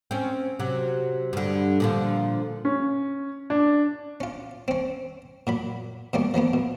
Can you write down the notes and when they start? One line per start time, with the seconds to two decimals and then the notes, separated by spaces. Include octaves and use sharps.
0.11 C4 C#4
0.59 C3 F#3
1.33 G2 D3
1.80 A#2 D3 F3
2.65 C#4
3.50 D4
4.20 C#4 F4
4.68 C4 C#4
5.47 A#2 F#3 B5
6.13 B2 G3 A#3 C#4
6.34 F3 F#3 A#3 B3
6.53 B2